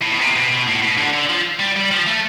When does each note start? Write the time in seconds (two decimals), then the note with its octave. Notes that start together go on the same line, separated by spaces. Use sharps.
0.02 A2
0.12 B2
0.20 C3
0.36 B2
0.52 B2
0.68 A2
0.82 B2
0.98 D3
1.13 D3
1.30 F3
1.59 G3
1.76 G3
1.91 F3
2.07 A3